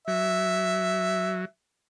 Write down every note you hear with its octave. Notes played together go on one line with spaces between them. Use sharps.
F#3 E5